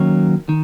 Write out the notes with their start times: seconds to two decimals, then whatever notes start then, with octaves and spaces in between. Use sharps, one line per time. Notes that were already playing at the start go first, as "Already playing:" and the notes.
Already playing: D#3 F#3 A#3 C#4 C#5
0.49 D#3